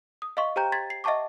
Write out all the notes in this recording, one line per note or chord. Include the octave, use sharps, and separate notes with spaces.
D#6
D#5 F5 C6 C#6
G4 C5 G5 A#5 G6
C6 G#6 A6 B6
C7
D#5 E5 F#5 A5 C#6 D6